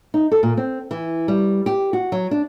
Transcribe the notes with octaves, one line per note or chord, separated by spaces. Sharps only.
D#4
A4
A#2
C4
E3
G3
G4
F#4
F#3
D4